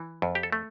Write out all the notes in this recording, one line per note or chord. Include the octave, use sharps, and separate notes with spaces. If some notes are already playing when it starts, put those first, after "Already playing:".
Already playing: E3
F2
G4
A4
A3